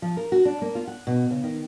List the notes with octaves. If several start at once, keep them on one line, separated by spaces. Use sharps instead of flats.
F3
A#4
F#4
D4
A#3
F4
F#5
B2
C#3
D#3